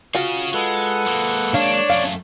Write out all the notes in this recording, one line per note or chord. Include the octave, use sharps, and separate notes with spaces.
C#4 F4 F#4 G#4
G#3 A4 B4 F#5
G#3 A#3
D4 C#5 F5
F#2 A3 F5